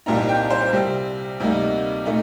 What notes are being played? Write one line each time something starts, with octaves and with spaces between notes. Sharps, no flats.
C2 A#2 G3 C4 D#4 A#5
G5
C5
C3 G3 C4
D2 C3 G3 A#3 D#4
A#2 A3 D#4